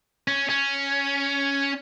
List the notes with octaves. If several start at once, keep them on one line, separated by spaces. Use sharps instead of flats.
C#4
C#4